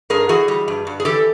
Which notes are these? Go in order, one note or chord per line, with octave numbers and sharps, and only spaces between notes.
G2 G#4 A#4
E3 F#4 G#4
G3
G2
G2
G#4
E3 G4 A4